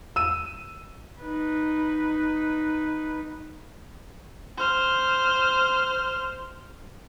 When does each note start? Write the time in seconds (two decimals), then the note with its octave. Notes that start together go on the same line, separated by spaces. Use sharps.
0.16 E6 D#7
1.21 D#4 B4
4.58 C5 F6